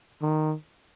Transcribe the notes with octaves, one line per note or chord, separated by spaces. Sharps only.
D#3